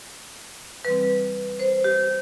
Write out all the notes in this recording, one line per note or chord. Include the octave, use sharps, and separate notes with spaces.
E3 G3 C4 B4
C5
G4